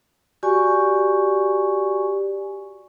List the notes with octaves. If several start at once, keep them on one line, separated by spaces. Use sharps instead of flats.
F#4 G4 D5 G#5 C#6